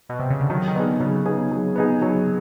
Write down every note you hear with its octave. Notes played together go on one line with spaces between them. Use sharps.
B2
C3
C#3
D3
D#3 F#3
D#3
D3 B3 D#4 G#4
C#3 F#3
B3 D#4 G#4
F#3
B3 D#4 G#4
F#3